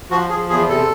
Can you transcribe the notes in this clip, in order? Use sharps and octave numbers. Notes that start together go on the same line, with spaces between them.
F3 F#4
F3 G#4
E2 G#4
C3 A4